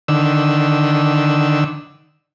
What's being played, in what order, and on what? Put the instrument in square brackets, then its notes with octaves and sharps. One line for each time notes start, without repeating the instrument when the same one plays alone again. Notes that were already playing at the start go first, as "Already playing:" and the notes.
[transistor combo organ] D3 D#3 E6